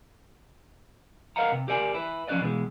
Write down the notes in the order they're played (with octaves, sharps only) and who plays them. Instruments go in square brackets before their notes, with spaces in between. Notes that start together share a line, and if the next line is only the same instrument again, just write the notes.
[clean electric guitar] A#4 B4 D#5 F5 F#5 A#5
C3
G4 A#4 D5 G#5
E4 B4
F3 C#4 G4 B4 D5 D#5
B2 E3 G#3